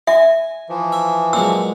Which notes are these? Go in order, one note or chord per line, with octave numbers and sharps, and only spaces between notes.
E5 G#5
E3 F3
E5
A#2 F#3 G#3 E6